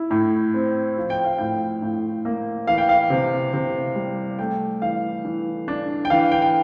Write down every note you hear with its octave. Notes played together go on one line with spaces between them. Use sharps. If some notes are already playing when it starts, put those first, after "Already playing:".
Already playing: E4
A2
C4
F3
G5
F5
A2 G5
A2
A#3
E3 F5
G5
F5
C3
C3
G3
A3 G5
E3 F5
E3
D4
G5
E3 F5
G5
G5